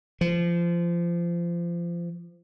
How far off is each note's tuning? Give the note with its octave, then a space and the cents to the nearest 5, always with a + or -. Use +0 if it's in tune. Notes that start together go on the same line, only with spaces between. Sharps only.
F3 -25